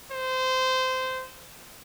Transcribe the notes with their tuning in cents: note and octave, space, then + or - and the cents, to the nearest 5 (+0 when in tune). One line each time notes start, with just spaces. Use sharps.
C5 -20